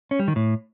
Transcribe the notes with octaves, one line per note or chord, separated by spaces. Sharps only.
C#4
G3
D#3
A2